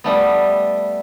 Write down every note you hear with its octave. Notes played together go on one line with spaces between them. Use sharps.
G3 A3 B3